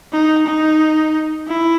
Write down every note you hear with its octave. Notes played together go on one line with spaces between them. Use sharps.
D#4
D#4
E4